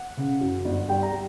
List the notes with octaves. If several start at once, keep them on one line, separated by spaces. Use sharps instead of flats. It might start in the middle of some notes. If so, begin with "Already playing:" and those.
Already playing: F#5
C#3
F#2
G1
G3 G5
A#5
G3